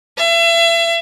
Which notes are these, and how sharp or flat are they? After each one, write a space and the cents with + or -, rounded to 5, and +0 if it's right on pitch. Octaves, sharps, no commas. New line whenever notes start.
E5 +35